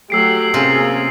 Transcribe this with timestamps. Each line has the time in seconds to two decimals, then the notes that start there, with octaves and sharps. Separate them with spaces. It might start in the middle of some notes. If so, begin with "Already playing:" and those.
0.10 F#3 A3 G4 E6 C7 D7
0.54 C3 A#3 C#4 F4 G#4